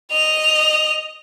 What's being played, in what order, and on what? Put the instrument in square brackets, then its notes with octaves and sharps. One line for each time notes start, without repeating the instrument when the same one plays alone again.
[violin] D#5 F7